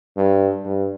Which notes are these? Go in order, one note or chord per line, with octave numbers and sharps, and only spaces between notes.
G2
G2